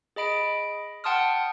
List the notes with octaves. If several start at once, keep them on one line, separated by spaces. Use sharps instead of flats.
G#4 D#5 B5 D7
F#5 G5 A5 C6 D#6 F6